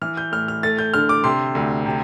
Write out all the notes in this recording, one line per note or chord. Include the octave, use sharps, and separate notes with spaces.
E3 F6
G6
A2 F6
F6
A3 A6
G6
D3 F6
D6
C3 C6
D2
C3